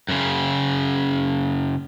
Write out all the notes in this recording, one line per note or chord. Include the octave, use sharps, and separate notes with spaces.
F#2 C#3